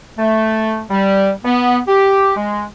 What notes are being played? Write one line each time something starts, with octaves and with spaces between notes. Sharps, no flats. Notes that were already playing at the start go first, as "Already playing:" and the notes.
A3
G3
B3
G4
G#3